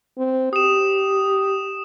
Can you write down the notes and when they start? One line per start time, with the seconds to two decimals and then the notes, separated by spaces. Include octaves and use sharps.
0.18 C4
0.53 G4 D#6 E7